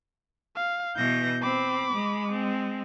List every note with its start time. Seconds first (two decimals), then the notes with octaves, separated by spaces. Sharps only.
0.56 F5
0.96 B2 E3 G6 A#6
1.42 C4 B5 D6
1.93 G#3
2.33 C4